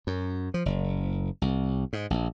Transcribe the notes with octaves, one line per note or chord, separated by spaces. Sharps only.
F#2
F3
F#1
C2
G#2
A#1